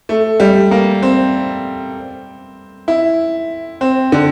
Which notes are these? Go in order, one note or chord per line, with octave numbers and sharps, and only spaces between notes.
A3
G3
A#3
C4
E4
C4
D3